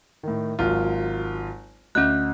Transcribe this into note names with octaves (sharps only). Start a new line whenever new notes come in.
A2 D#3
G#1 F#3 F4
D2 C#4 D#5 F#6